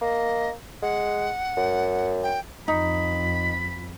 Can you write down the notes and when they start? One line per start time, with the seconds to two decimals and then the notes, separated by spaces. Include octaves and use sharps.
0.02 A#3 D#5
0.82 G#3 F#5
1.57 F#2
2.23 G5
2.68 F2 D#4 B5